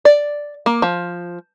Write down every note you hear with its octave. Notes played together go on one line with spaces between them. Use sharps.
D5
A#3
F3